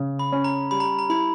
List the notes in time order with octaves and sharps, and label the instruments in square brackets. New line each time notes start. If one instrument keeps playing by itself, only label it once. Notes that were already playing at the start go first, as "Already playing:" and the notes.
Already playing: [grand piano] C#3
[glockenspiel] B5
[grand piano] C#4
[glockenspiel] A#5
[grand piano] G3 [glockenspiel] B5
[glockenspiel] A#5
A#5
[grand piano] E4 [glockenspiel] B5